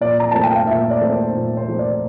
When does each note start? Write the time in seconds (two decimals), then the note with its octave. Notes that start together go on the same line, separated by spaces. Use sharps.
0.01 A#2 D5
0.19 A#5
0.31 A3 C4 A5
0.44 G5
0.55 F5
0.67 A#2 E5
0.91 D5
1.01 A3 C4
1.12 C5
1.35 A#2
1.57 C5
1.68 A3 C4
1.79 D5